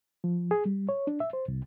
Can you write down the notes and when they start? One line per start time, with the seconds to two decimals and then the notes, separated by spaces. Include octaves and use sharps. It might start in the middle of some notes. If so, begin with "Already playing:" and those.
0.24 F3
0.51 G#4
0.65 G3
0.89 C#5
1.07 D4
1.20 E5
1.33 C5
1.48 C2